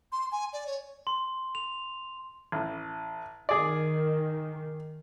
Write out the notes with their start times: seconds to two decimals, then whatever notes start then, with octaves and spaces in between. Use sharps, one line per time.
0.12 C6
0.32 G#5
0.53 D5
0.67 C#5
1.07 C6
1.55 F7
2.52 A1
3.49 D#3 G#4 D5